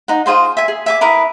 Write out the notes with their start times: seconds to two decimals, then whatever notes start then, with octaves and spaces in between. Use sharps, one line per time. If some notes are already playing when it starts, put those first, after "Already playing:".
0.08 D#4 F#5
0.26 F4 G#4 C5 F5
0.57 E5 G#5
0.68 G#4
0.86 E5 G#5 D6
1.01 E4 G#4 A#4 B4